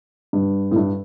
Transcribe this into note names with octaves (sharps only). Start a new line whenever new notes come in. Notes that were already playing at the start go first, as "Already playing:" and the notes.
G2
A2
G2